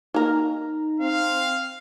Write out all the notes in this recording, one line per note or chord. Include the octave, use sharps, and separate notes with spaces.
A#3 D#4 A#4 A#5
C4 F5